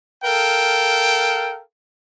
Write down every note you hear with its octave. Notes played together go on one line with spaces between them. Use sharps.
A4 A#4 F5 G5